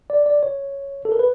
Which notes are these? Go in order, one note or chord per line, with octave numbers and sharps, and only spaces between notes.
D5
D5
C#5
A4
A#4
B4